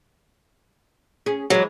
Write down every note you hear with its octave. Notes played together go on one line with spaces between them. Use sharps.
C#4 G#4
E3 F#3 G#3